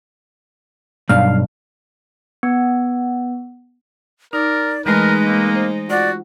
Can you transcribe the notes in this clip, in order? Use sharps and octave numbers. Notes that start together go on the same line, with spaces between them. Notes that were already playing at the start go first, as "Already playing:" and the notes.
B1 G2 F5
B3
D#4 A#4 D5
E3 G#3 A3 D#4 A#4 B4
A#3
C5
F4 F#4 D5 F#5